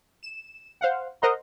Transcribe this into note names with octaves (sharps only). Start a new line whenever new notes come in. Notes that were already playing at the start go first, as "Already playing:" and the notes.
E7
C5 F5 F#5
A#4 C5 D#5 F#5 A#5 C6